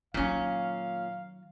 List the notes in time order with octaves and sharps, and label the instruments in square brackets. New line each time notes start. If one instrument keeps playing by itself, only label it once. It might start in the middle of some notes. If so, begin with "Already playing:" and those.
[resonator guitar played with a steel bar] A#2 C#4 [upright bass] D#3 F#3 [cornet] F5